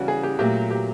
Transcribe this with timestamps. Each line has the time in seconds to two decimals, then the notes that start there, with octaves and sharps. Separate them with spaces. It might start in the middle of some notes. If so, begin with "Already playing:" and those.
Already playing: C#3 E3 G3 C#4 F#4
0.08 G#4
0.23 G4
0.39 A#2 F#3 A3 G4
0.71 G4